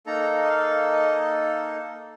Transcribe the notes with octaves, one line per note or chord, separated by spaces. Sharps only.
A#3 D#4 A4 A#5
D#5
F5
D#5